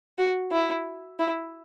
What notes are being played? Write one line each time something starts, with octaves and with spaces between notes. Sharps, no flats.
F#4
E4
E4